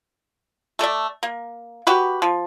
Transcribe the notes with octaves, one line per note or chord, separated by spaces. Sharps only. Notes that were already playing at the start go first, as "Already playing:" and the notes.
A3 A4 D5 E5
A#3
F#4 G4 B4
F3